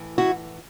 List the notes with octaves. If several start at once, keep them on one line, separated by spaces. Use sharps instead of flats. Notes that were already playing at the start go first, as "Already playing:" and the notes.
Already playing: A2 E3
E4 F#4